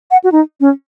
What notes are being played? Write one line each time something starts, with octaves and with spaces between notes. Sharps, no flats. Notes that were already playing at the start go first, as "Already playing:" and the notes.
F#5
F#4
D#4
C#4